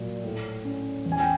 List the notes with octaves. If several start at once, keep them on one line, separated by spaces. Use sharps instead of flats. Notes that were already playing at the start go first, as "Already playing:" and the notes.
Already playing: A#2 F#3 D5
A2
C#4
E2
G#5
G5